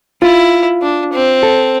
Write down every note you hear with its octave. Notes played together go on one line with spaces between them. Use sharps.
E4 F4
D4
C4
A4